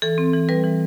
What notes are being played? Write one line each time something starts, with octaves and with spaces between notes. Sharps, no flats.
E3 A4
C4
E3
G3 B4
E3